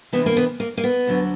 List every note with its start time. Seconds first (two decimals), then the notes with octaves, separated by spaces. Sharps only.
0.13 D2 C3 E3 B3
0.26 A#3
0.37 B3
0.60 A#3
0.77 A#3
0.84 B3
1.07 D2 D3 F#3